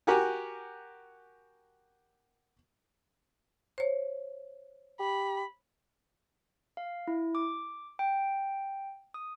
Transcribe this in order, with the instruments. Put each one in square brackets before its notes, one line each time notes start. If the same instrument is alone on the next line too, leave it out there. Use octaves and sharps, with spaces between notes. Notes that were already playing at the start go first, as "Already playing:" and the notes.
[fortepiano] F#4 G4 A#4 F#5 G#5
[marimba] C5 C#5
[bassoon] G4 [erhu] B5
[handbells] F5
E4
D6
G5
D#6